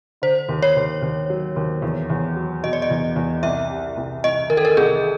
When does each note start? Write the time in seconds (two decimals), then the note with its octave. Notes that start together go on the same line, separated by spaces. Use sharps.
0.22 D3 C5
0.48 D#2
0.62 C#5
0.76 D#2
1.02 D#2
1.30 F#3
1.56 D#2
1.82 E2
2.10 E2
2.36 F#3
2.63 B2 D#5
2.73 D5
2.82 D#5
2.90 E2
3.16 E2
3.43 C2 E5
3.70 C3
3.97 C2
4.24 C2 D#5
4.50 D#3 A#4
4.57 A4
4.65 A#4
4.77 C2 G#4